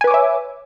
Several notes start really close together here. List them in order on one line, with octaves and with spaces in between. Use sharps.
G#5 B4 D6 C#5 E5